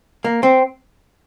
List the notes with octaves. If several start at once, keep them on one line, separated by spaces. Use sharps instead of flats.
A#3
C4